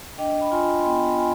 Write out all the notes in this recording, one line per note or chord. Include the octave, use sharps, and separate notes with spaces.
D4 D#5 G5
B5
F4 G#5 C6
C6
B3 G5 B5
F4 G#5 C6